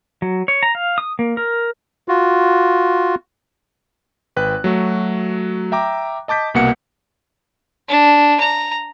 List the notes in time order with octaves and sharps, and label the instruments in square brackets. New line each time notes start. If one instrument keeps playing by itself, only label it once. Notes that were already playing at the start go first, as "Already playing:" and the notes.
[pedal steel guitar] F#3
C#5
A#5
F5
D#6
A#3
A#4
[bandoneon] F4 F#4
[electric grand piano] G#1 B4 G5 F#6
F#3 A3 F#4
E5 G5 A#5 D6
D#5 A5 D6 G6 B6
C2 B2 A#3 F#5 C#7
[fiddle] D4
A#5